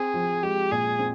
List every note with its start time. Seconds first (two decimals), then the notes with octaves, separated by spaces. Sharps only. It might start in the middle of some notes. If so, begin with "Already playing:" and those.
Already playing: C4 G#4
0.14 F3
0.43 G#3 G4
0.71 A#2 G#4
0.99 C4